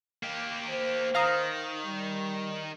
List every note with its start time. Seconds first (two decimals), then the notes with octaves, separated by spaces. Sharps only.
0.23 A#3 G4
0.70 C5
1.15 D#3 F5 A#5 D#6
1.84 G3